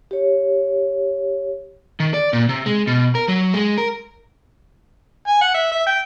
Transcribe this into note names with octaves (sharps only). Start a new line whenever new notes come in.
G4 C#5
D#3
D5
A#2
C3
G#3
B2
A#4
F#3
G#3
A#4
G#5
F#5
E5
E5
G5